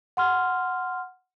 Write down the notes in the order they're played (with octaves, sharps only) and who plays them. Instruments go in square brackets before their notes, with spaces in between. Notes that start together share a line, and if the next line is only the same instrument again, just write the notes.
[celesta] F#5 C6 F6